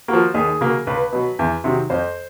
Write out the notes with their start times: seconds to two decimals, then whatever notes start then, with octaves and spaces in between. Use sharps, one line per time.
0.08 F3 A#3 F#4
0.34 D#2 G#4
0.61 C#3 F#3 A#3
0.87 C#2 B4
1.12 B2 F#3
1.39 E2
1.64 C3 D#3 F#3
1.90 F2 C5